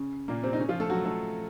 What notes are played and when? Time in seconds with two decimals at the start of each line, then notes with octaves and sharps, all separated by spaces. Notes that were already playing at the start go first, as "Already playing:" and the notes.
Already playing: C#3 C#4
0.28 A#2 A#3
0.43 C3 C4
0.53 D#4
0.59 C#3 C#4
0.69 F3 F4
0.80 A3 A4
0.90 F#3 F#4
1.05 A3 A4